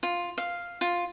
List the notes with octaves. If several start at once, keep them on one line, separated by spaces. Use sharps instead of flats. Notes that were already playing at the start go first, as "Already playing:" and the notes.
F4
F5
F4